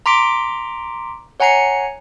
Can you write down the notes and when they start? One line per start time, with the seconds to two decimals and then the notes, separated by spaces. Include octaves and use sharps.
0.06 A#5 C6 D6 B6 D7
1.40 C#5 F#5 G#5 A#5 C7 C#7